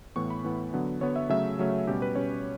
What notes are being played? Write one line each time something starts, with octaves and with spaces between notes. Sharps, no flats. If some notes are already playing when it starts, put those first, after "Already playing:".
A2 E3 B3 C#6
B5
A2 E3 B3
D3 F#3 B3
D3 F#3 B3 C#5
E5
C#3 F#3 A3 C#4 E5
C#3 F#3 A3 C#4
B2 G3 C#4 G4
B4
B2 G3 C#4 C#5